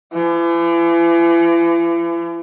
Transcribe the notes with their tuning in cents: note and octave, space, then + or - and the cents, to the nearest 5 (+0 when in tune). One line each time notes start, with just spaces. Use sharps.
E3 +40